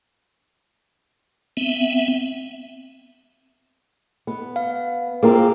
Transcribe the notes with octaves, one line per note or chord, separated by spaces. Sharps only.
B3 C4 E5
B3
F5
A#3 C4 F4 G#4 A#4 A#5